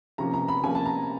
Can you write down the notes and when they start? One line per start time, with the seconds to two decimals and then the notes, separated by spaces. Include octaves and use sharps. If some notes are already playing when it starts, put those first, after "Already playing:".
0.18 C3 F3 A#3 C#4 A#5
0.34 A#5
0.48 B5
0.63 C3 F3 A#3 C#4 G#5
0.75 A5
0.86 A#5